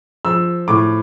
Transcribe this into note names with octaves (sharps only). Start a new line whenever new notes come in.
F3 E6
A2 D6